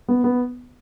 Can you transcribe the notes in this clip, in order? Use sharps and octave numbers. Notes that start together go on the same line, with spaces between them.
B3
B3